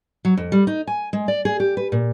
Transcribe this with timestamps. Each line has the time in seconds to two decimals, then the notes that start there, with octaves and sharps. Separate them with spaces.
0.25 F#3
0.37 F2
0.52 G3
0.67 D#4
0.87 G#5
1.13 G#3
1.28 D5
1.45 G#4
1.60 G4
1.77 B4
1.92 A#2